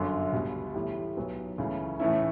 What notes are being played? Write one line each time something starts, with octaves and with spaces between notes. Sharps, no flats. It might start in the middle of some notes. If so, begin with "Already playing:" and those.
Already playing: G1 F#2 D3
C#2 B2 G3
A1 A2 G3
B1 B2 F#3 B3
C#2 C#3 E3 A3 C#4
A2 E3 A3 C#4 E4